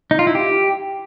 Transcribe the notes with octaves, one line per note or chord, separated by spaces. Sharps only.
D#4
F4
E4
G4